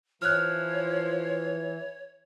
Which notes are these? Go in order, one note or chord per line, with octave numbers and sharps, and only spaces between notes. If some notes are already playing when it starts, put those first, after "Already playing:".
E3 F3 C#5 F6 F#6